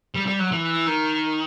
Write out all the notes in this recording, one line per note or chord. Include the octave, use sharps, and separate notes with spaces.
G3
G3
F#3
E3
D#3